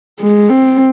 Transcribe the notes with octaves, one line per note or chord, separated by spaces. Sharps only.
G#3
C4